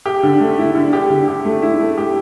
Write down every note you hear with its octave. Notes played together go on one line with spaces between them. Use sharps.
G4
D3
A3
E4
D3
G4
D3
G4
A3
E4
A3
G4